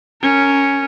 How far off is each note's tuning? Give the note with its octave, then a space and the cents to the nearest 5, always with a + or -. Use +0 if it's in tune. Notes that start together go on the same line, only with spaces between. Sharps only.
C#4 +0 A#4 -15